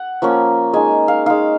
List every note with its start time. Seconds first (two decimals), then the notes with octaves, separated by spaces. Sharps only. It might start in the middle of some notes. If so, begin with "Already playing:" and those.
Already playing: F#5
0.22 F3 A#3 C#4
0.73 G#3 D#4 G#5
1.08 F5
1.26 G#3 D#4 F5